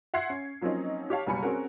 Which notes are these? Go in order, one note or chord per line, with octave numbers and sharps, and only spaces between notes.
E5 F#5 C6 G#6 C7 C#7
C#4
F3 F#3 A#3 C4 C#4 D#4
G4 C#5 F5 A5
F#1 B2 G3 G#5 B5 C#7
C4 C#4 F#4 G#4 A#4